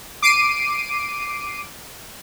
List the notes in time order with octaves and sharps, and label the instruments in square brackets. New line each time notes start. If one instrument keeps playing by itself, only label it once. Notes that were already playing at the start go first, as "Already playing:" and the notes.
[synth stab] D6 C7 D7 D#7